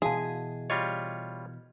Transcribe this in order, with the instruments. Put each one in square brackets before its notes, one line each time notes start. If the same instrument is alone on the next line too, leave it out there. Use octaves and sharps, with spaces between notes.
[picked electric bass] B2 E3 [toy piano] F#4 F5 A5 [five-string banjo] G#4
[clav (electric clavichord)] G3 F4 C#5 [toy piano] D#5